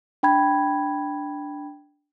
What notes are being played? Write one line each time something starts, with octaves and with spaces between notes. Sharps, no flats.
D4 G5 B5 G#6